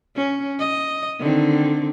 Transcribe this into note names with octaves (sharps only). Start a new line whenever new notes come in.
C#4
D#5
D3 D#3 C4